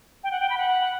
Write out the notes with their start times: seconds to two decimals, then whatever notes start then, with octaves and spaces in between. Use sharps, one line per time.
0.24 G5
0.31 F#5
0.40 G5
0.50 B5
0.58 F#5